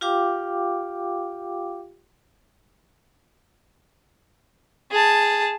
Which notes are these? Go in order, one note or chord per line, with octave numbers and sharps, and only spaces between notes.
F4 G4 F5 G5 D6
G#4 A5